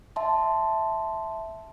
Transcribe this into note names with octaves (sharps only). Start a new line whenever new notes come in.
E5 A5 C6